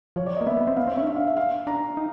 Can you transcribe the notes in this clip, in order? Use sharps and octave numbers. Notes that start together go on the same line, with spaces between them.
F3 C#5
D5
D#5
A#3
B3 E5
B3
C4
B3 F5
C4
E5
C#4
D#4
D4 E5
F5
E5
F5
D4 A#5
D#4